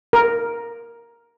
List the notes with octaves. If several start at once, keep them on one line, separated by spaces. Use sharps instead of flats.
A#4